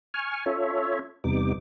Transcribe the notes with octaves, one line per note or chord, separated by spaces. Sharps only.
G#5 C#6 F6
C#4 F4 A4 C#5 E5
E2 C3 G3 B3 D#4 D6